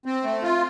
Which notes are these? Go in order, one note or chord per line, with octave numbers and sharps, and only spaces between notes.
C4
A3
F4